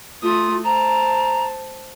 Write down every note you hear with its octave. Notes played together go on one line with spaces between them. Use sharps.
A3 F4 D#6
C5 A5 A#5